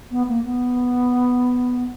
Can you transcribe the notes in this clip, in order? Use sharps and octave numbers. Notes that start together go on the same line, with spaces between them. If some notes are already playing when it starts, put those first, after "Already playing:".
B3
A#3
B3